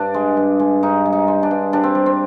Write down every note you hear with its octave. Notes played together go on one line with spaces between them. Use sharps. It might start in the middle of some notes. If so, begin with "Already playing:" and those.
Already playing: G2 D4
G#3
G2
G#3
G2 D#4
G#3
D#4
G#3
D4
G2
G3 D4
C4
G3
C4